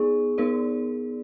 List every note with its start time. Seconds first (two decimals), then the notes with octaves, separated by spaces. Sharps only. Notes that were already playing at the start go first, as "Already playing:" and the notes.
Already playing: B3 D#4 G#4 D5
0.38 B3 D#4 A#4 D5